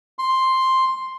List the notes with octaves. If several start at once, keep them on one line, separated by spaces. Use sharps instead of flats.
C6